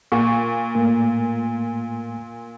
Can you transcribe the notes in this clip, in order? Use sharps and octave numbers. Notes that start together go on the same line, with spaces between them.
A#2 C#6
A2 A3 A#3